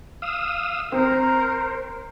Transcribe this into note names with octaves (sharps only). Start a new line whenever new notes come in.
F5 D#6 E6
C4 A#4 C5